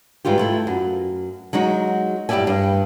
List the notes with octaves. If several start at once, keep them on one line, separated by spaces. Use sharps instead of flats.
G#2 E3 G3 F4 G4
A3 E4 F4
F#2
F#3 G#3 D#4 F#4
G2 E4 G4 D5 E5 G#5
G2